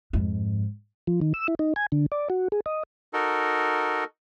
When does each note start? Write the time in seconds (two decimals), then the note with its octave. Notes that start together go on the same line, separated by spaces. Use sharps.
0.13 F2 G#2
1.07 F3
1.21 D#3
1.34 E6
1.48 E4
1.59 D#4
1.76 G#5
1.92 D3
2.12 D5
2.30 F#4
2.52 G#4
2.66 D#5
3.13 D#4 F#4 A4 A#4